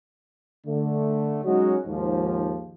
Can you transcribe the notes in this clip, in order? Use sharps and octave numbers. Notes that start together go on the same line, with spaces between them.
D3 A3
F#3 G#3 C#4 D#4 F#4
D#2 G#2 F3